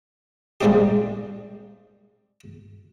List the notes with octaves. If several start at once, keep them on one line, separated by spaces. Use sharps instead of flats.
G3 G#3 A#3 C4 D#4 G4